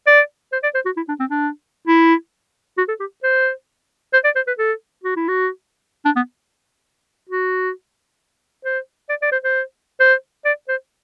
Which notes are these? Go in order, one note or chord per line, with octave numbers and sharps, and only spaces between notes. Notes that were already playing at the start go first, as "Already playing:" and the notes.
D5
C5
D5
C5
F#4
E4
D4
C4
D4
E4
F#4
A4
G4
C5
C5
D5
C5
B4
A4
F#4
E4
F#4
D4
B3
F#4
C5
D5
D5
C5
C5
C5
D5
C5